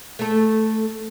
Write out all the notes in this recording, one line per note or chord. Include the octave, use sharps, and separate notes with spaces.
A3 A4